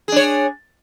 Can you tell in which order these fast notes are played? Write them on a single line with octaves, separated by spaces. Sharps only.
G#4 D4 C#5